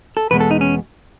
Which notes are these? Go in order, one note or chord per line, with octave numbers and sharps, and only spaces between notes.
A4
E2 B2 G#3 B3 B4
A4
D#4
C#4